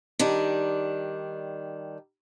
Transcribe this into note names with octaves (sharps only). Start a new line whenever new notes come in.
D#3 G3 D4